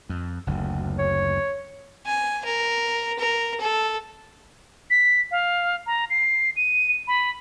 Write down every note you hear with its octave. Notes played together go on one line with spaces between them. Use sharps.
F2
F#1 D2
C#5
G#5
A#4
A#4
A4
B6
F5
A#5
C7
D#7
B5